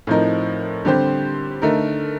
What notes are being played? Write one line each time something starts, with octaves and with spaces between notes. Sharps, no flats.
A2 F3 C4 D#4 A#4
D3 G3 C4 G4 C5
D3 A3 D#4 A#4